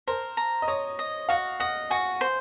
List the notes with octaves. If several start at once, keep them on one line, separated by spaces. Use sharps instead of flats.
A#4 C5
A#5
D#5
C#5 D#6
D#5
F#4 F5
D#5 F#5
F#4 G#5
C5